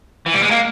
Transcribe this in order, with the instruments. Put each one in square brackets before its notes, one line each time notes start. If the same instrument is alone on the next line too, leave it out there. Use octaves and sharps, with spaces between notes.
[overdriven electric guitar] E3
G3
G#3
A#3